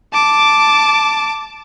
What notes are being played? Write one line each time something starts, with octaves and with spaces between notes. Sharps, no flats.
A5 D6